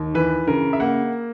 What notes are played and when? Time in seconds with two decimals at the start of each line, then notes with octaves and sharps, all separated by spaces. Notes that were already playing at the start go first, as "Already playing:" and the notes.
Already playing: D#2
0.14 E3 B4
0.47 C#3 A#4
0.73 E5
0.80 A#3 F#5